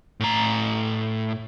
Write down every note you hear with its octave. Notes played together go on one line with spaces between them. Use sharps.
A2 A#5